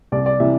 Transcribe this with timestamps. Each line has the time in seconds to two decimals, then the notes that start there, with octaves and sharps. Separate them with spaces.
0.12 C2 D5
0.26 D5
0.40 C3 E3 E5